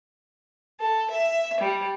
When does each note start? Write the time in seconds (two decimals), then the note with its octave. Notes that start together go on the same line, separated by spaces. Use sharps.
0.80 A4
1.11 E5
1.61 G3